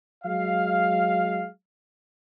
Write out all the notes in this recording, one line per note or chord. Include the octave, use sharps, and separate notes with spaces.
F#3 G#3 F5